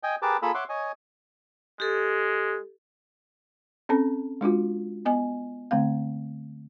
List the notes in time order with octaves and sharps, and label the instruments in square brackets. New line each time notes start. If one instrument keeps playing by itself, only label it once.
[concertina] D#5 G5 G#5
G4 G#4 A#4 B4 A5 D6
A#3 F4 G#4 A4 B5 E6
C#5 E5 F#5 C6 D6
C#5 D#5 G#5
[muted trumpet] G#3 [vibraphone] G4 A4
[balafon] C4 C#4 A4 A5
G#3 D4 F4 F#4
B3 D#5 G#5
D3 A3 C4 F5